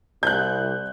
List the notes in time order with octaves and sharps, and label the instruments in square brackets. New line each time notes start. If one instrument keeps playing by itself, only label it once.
[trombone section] C2 [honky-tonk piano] F#6 G6